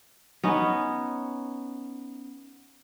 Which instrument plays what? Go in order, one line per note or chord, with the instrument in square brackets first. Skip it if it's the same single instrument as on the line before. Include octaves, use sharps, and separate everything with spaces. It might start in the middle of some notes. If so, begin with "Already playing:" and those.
[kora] B3 C#4 D#4